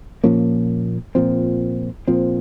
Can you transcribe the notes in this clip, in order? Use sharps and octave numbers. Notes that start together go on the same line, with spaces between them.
A#2 F3 A#3 C#4
A#2 F3 C4
A#2 F3 C4